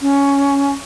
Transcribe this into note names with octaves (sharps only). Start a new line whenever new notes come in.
C#4